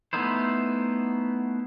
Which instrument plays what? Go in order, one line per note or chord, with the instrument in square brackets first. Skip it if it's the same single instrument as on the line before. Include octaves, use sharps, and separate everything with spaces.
[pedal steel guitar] A3 B3 D#4 E4 C5